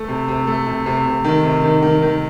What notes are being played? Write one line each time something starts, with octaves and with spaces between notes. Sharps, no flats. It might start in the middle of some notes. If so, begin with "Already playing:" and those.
Already playing: A3
C3
C3
A3
C3
C3
C3
D#3
C3
D#3
D#3
D#3